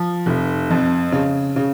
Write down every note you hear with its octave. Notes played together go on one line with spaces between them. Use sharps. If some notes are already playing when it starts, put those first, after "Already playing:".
Already playing: F3
F1
F2
C#3
C#3